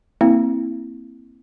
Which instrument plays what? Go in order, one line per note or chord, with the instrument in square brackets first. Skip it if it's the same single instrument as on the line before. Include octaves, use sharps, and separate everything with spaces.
[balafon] A#3 C4 E4